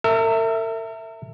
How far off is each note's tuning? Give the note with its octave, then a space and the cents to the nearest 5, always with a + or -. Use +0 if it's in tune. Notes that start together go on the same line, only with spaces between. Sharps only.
A#4 -45 E5 +0